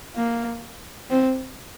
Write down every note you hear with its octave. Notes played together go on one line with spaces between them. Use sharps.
A#3
C4